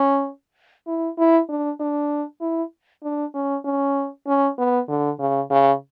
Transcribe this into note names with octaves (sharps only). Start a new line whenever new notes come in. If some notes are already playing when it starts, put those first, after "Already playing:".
Already playing: C#4
E4
E4
D4
D4
E4
D4
C#4
C#4
C#4
B3
D3
C#3
C#3